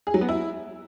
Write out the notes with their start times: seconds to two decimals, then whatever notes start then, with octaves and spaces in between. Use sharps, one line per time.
0.07 G#4
0.14 F#3
0.21 B3
0.29 E4